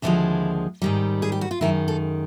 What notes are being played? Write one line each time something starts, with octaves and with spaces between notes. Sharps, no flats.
D#2 D3 F3 G#3 E4
G#2 D#3 G3
G#4
G4
F#4
F4
F#2 D#3 G#3 E4
A4